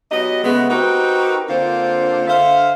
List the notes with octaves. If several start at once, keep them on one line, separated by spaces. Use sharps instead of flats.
F#3 B3 G4 D#5
C#3 G#3 A3 B3
C4 D#4 F#4 G4 A#4 B4
D3 A#3 C4 D4 F4 C5
D3 C5 E5 F5